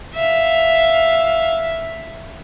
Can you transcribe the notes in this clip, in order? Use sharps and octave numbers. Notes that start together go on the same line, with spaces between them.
E5 F5